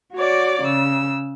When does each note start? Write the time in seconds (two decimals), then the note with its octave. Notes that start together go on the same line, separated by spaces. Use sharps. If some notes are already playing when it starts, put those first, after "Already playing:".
0.15 F#4 C#5 D5 D6
0.64 C#3 E6